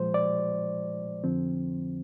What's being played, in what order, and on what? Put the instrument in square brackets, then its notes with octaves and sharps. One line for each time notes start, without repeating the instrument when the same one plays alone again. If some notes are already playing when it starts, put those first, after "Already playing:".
Already playing: [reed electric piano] A#2 F3 G#3 C5
D5
F2 D3 F3 C4